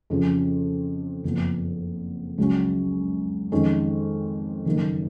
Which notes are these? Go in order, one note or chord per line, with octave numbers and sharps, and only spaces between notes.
F2 C#3 F3
F#1 F2 F3 B3
C#2 C#3 F#3 C#4
F2 D#3 G#3 C#4
F#1 F#2 D#3 A#3